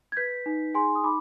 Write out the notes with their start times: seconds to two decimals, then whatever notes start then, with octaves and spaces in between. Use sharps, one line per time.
0.12 G#6
0.17 B4 G6 B6
0.46 D#4
0.74 G#4 G#5 C6
0.95 D#6
1.03 D#4 B5 D6